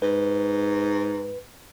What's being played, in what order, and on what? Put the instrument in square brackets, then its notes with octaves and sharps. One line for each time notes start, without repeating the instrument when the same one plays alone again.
[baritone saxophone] G#2 [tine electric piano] B4